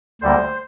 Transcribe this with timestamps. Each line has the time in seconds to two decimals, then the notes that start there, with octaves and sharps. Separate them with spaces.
0.21 D2 D3 G3 A#3 C5